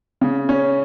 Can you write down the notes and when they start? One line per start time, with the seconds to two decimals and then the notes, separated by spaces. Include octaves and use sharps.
0.21 C#3
0.49 C#4